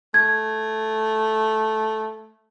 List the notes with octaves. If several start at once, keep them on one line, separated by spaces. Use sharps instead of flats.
A3 G#6